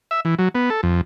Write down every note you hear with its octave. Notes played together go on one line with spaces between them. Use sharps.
E5
E3
F#3
B3
A4
F2